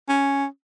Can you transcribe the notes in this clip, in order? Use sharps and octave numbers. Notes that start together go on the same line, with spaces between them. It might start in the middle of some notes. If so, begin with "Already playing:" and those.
C#4